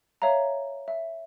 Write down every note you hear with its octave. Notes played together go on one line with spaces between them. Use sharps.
C#5 E5 F5 A#5
E5